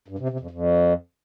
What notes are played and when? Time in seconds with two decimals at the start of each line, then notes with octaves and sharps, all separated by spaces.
0.08 G2
0.19 C3
0.29 C3
0.40 F2
0.50 F2